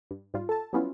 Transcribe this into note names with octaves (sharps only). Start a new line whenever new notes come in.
G2
G#2 G3 F4
A4 A5
F#3 G3 B3 C#4 E4 F4